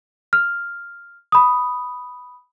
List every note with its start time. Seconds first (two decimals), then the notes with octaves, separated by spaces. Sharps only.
0.33 F6
1.32 B5 D#6